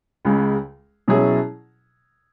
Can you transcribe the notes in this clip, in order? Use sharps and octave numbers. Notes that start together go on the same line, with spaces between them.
C#2 C#3 G#3
B2 F#3 C#4 E4 G#4